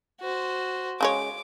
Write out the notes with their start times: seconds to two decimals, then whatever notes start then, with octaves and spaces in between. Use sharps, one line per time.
0.21 F#4 C5
1.01 C#3 G#3 C#5 D6